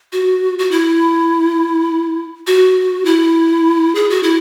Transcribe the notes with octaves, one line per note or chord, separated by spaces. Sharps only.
F#4
F#4
E4
F#4
E4
G#4
F#4
E4